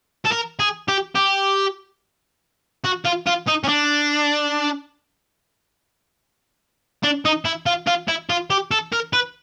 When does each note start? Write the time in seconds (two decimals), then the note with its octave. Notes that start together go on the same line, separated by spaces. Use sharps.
0.25 A4
0.32 A#4
0.59 G#4
0.88 G4
1.15 G4
2.84 F#4
3.05 F4
3.26 F4
3.47 D#4
3.64 C#4
3.68 D4
7.03 D4
7.25 D#4
7.45 E4
7.66 F4
7.87 F4
8.08 E4
8.30 F4
8.50 G4
8.71 A4
8.92 A#4
9.13 B4